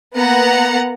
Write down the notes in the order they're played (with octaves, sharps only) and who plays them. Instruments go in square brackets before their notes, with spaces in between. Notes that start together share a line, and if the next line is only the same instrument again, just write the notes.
[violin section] A#3 B3 F#5 A#5